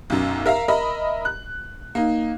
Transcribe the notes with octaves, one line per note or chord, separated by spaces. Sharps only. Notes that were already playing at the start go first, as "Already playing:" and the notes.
B1 F#2
A#4 E5 F5 A#5
A#4 D#5 E5 B5
F#6
A#3 D#4